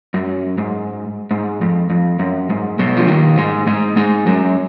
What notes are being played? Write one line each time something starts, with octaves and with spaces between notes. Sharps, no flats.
F#2
G#2
G#2
F2
F2
F#2
G#2
B1 B2
F3
D#2 D#3
G#2 G#3
G#2 G#3
G#2 G#3
F#2 F#3